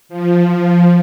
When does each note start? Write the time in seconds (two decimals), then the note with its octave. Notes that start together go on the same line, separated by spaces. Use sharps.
0.09 F3
0.47 F3